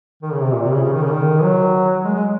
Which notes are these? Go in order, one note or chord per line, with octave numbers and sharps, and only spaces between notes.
D#3
C#3
C3
A#2
C3
C#3
C#3
D#3
C#3
D#3
F#3
G#3
G#3